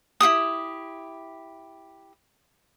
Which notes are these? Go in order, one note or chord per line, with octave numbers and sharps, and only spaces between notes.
E4 F#4 G4 D#6